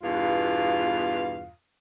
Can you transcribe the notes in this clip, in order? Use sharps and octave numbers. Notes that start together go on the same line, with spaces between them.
E2 G2 B2 F4 F5